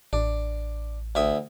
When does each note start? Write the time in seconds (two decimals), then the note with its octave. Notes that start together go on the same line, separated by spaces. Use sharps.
0.13 A1 D4
1.15 D2 E5 D#6